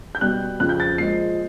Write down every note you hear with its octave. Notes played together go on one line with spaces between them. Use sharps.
G6
B2 G3 B3 F#6
F2 C#3 F3 F#6
G6
A6
A#2 F3 G#3 C7